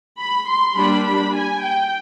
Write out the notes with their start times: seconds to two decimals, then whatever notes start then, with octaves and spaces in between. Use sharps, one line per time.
0.20 B5
0.49 C6
0.77 G3 A#3 D4 B5
1.06 B5
1.35 G#5
1.64 G5